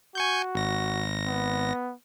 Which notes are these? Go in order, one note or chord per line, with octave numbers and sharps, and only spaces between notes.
F#4 G#5 C#6 G6
G#1 A#6
B3